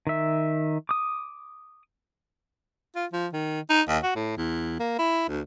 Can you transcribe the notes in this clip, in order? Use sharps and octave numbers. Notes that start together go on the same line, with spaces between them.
D#3 E5
D6 D#6
F4
F3
D#3
D#4
D#2
F#4
A2
E2
A#3
E4
D2